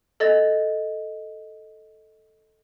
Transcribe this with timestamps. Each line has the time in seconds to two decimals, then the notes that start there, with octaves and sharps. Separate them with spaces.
0.20 A4 D#5 A6